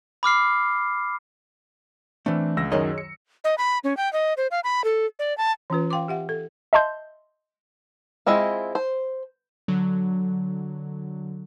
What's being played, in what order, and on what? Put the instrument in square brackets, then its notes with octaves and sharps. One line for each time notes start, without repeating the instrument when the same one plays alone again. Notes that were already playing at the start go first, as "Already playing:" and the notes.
[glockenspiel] B5 D6 F6 C7
[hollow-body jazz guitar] E3 A3 [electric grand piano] C4 D4
[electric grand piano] C#2 E6 A#6
[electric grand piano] F#2 D#3 F#3 [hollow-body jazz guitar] G#4 C#5 D#5
[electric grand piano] C#7
[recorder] D#5
B5
C#4
G5
D#5
C5
F5
B5
A4
D5
A5
[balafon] E3 C#4 F4 B4
F5 G5 C6 D6
G4 E5 F#5
A4
[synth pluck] D#5 E5 A5 C6 G6
[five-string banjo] G#3 C4 E4 F4
C5
[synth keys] D3 F#3